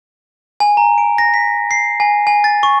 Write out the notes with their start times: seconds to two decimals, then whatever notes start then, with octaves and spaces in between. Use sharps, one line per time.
0.60 G#5
0.77 A#5
0.98 D7
1.18 A#6
1.34 B6
1.71 C7
2.00 G#5
2.27 G#5
2.44 A6
2.63 C#6